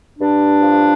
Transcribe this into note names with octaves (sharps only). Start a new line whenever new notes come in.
G2 D4
F3